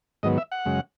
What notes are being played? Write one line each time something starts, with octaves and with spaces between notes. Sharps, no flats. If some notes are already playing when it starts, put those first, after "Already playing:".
G#2 D#3 F#3 B3 D#5
E5
F#5
F#2 C#3 G#3